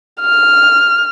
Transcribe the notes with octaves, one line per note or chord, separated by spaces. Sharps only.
F6